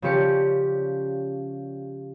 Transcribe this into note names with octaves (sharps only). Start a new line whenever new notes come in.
C#3 F3 C#4 G4 D5 C#7